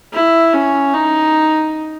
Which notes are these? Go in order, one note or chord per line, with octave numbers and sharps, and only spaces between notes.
E4
C#4
D#4